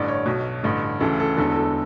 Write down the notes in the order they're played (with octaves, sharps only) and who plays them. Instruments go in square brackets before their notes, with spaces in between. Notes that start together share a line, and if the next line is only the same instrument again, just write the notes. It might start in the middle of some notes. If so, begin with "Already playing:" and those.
Already playing: [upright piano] A1 G2 D3 D5
C#5
B1 B2
A1 G2 D3
D2 C#3 E3 A4
A4
E1 E2 D3 A4
A4